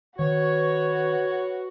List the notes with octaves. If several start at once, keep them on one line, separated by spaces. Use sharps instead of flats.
D#3 F#4 B4 C#5